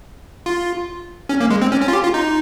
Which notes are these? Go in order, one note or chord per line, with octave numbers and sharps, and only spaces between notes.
F4
C#4
A#3
G#3
C4
C#4
C#4
F4
G4
F4
D#4